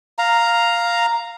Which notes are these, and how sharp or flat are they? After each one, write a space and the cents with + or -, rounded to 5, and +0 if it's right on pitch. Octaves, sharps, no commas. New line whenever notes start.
F5 +0 A#5 +0